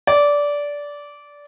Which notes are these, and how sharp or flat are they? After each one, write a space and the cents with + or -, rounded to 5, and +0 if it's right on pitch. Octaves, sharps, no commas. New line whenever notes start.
D5 -15